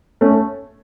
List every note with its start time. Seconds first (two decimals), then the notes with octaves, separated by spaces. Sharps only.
0.21 A3 C#4